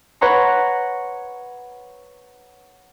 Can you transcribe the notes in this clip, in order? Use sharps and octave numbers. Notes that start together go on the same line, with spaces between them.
B4 C#5 F#5 A#5 C6